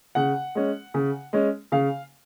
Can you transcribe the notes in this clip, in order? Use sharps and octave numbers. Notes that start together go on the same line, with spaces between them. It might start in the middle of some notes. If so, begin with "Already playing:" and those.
C#3 F#5
G#3 C#4
C#3
G#3 C#4
C#3 F5